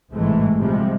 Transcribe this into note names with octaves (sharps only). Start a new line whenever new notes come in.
A1 G#2 C3 E3 G#3 A3
C3 F3 G3 G#3